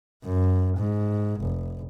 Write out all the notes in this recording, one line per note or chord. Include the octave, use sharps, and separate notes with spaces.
F#2
G#2
F1